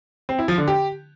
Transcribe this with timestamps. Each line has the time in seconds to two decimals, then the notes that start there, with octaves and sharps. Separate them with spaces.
0.29 C4
0.39 E4
0.48 F3
0.58 D3
0.68 G4